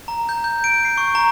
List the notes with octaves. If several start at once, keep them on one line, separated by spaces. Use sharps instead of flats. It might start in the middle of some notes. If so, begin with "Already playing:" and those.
A#5
G6
G6
D7
C7
C#6
A#5